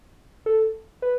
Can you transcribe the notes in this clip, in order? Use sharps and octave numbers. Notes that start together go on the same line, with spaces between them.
A4
B4